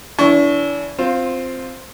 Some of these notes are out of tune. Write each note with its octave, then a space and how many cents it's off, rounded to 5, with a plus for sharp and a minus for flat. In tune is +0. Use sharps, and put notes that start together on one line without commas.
E3 +0 D4 -40 C#6 +0
C4 +0 F4 +5 C5 +35